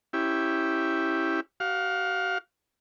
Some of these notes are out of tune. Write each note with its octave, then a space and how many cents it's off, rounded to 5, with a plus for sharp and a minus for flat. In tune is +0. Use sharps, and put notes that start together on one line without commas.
C#4 -15 E4 +0 G4 +0
F#4 +45 F5 +20